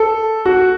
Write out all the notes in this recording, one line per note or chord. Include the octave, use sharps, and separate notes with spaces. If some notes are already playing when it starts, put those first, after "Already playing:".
Already playing: A4
F#4